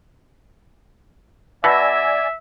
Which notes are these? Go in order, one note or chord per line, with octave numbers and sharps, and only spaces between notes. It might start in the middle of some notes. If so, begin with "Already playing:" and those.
B2 D5 E5 G#5 E6 A#6